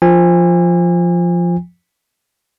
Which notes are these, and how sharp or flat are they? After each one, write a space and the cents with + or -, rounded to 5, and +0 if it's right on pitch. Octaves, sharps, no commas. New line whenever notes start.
F3 +0 G#5 -30